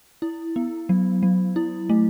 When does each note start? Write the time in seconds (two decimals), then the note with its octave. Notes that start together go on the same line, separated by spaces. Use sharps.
0.22 E4
0.56 B3
0.89 F#3
1.23 F#3
1.56 E4
1.89 A3